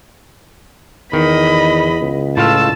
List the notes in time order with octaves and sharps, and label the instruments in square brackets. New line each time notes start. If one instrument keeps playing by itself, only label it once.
[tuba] E2 [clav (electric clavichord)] D#3 [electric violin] D#5 B5
[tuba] C#2
[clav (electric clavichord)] A2 F4 F5 [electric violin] A5 E6